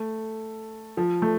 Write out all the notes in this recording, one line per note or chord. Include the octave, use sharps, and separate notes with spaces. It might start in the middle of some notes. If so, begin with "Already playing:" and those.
Already playing: A3
F3
A3